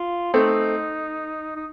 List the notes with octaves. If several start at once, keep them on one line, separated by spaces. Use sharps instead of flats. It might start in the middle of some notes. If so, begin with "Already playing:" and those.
Already playing: F4
A3 C4 D#4
D#4